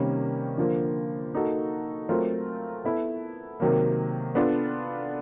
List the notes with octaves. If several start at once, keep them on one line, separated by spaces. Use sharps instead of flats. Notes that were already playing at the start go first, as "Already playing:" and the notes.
Already playing: C3 D#3 G3 A#3 C#4
D3 F3 A#3
A#3 D#4 F#4 A4
F#3 A3 C4 F4 A#4
B3 E4 A4
C3 D#3 F#3 A#3
B3 D4 F4 A4